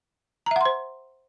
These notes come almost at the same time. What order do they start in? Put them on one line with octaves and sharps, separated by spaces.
A#5 E5 F#5 C6 C5